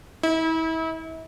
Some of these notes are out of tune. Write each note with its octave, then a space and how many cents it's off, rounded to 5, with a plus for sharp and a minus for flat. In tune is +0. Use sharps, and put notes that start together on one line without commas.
E4 -35